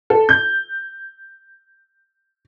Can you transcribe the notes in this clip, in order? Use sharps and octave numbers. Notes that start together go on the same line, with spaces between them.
A4
G6